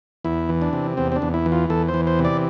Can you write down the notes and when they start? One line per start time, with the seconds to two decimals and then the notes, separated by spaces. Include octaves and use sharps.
0.25 E2 E4
0.49 E3
0.62 D4
0.73 C3
0.97 E2 C4
1.12 C4
1.16 D4
1.22 E2
1.34 E4
1.46 E3
1.52 F4
1.70 E2 A4
1.88 C5
1.94 E3
2.07 C5
2.19 C3
2.25 D5